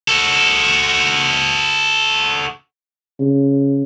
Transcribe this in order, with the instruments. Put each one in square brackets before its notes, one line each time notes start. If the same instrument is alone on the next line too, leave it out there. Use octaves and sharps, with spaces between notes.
[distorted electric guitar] F#4 A4
[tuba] C#3